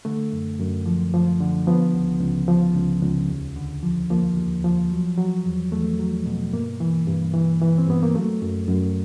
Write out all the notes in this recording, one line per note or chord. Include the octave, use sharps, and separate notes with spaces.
D3 A3
F#2
F#2
F3
F3
D3
F3 B3
C#2
C#2
F3
C#2
C#2
D#2
D3
F3
F3 A#3
D#2
F3
F#3
F#3
E2
E2 A3
F#3
B2
G2 A#3
E3
G2
E3
E3
C4
G2 B3
A#3
F#3 A3
F#2
F#2